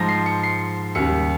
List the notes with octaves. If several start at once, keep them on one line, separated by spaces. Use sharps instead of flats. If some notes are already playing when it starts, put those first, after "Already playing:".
Already playing: G#2 F3 A#6
C7
C#7
C7
D#2 C#3 G3 C#7